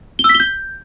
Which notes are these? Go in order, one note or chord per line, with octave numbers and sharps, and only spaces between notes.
G7
E6
B6
G7
G6